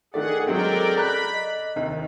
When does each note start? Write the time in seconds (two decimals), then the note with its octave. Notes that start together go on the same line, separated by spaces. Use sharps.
0.14 D#3 A3 G#4 A4 D5 F#5
0.47 F#3 G#3 C4 A4 A#4 D5 G5
0.96 D5 A#5 B5 F#6
1.33 D#5
1.76 D#2 C3 D#3